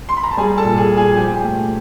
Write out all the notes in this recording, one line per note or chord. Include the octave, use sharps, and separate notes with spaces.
C6
B5
A#5
A5
G3 G#4 G#5
A4 A5
A#2
G#4 G#5
A#2
G#4 G#5
G#5
F3 G4 G5
A3